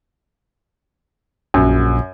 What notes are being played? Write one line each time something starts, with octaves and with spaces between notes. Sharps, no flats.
A#1 F#2